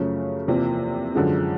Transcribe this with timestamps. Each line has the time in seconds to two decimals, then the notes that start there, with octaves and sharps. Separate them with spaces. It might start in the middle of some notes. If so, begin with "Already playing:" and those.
Already playing: F#2 C#3 F3 A3 C#4
0.48 E2 C3 F3 A#3
1.15 F#2 D3 F3 G#3